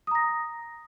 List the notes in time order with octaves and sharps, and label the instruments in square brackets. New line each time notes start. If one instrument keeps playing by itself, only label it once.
[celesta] D#6
A#5
A#6